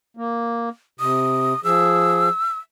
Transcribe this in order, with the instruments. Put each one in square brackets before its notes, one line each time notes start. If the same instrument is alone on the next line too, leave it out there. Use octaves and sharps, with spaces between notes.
[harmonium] A#3
[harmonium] C3 [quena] D#6
[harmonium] F3 G#4 [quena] E6